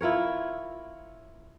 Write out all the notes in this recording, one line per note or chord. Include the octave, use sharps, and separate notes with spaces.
E4 F4 A#4 C#5